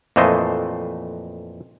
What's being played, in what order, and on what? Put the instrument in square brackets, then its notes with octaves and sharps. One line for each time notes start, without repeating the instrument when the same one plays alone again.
[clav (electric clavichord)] F2 A#2 E3 A3 C5 D#5